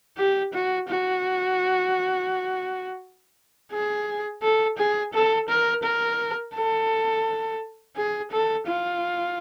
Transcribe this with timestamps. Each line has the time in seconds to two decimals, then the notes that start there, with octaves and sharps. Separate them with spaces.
0.18 G4
0.54 F#4
0.89 F#4
3.72 G#4
4.42 A4
4.78 G#4
5.13 A4
5.49 A#4
5.83 A#4
6.55 A4
7.96 G#4
8.31 A4
8.67 F4